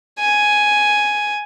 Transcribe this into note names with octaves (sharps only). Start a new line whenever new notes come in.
G#5